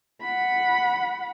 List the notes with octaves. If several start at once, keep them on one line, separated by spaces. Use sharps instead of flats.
F#5 B5